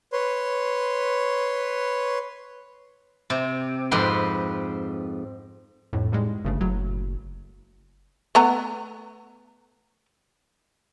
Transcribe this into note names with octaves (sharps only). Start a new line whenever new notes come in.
B4 C#5 C6
C3
F2 G#2 G4 B4 C6
G1 F2 A2
G#2 G3 G#3
G1 G2 C#3 A3
F#1 A2 F#3
A3 B3 A#5